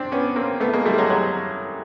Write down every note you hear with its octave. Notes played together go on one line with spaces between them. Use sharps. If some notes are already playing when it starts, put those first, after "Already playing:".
Already playing: C4 D4
B3 C#4
A#3 C4
A3 B3
G#3 A#3
G3 A3
F#3 G#3
F#3 G#3